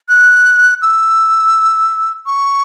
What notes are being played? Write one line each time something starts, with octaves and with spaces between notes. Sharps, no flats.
F#6
E6
C#6